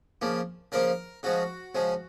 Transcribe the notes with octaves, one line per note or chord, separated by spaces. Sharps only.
C#3 F3 A#3
C#3 F3 A#3 A#4
C#3 F3 G#3 F#4
C#3 F3 G#3